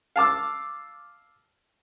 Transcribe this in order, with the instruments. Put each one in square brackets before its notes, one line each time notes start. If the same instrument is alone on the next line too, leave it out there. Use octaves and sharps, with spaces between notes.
[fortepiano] F5 A5 D6 E6